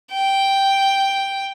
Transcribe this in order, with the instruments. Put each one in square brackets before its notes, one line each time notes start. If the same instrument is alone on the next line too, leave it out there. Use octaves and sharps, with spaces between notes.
[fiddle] G5